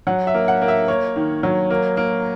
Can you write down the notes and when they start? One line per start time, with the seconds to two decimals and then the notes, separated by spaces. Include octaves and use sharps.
0.07 F#3 F#5
0.27 E5
0.34 A#3
0.48 F#5
0.62 A#3
0.68 E5
0.88 A#3 C#5
1.16 D#3
1.43 F#3
1.70 A#3
1.97 A#3